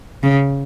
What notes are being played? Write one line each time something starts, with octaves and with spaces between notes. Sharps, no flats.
C#3